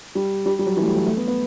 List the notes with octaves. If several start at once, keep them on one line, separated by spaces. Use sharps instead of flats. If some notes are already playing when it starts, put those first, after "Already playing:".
G3
G3
G3
F#3
E3
A3
G3
F#3
A3
B3
B3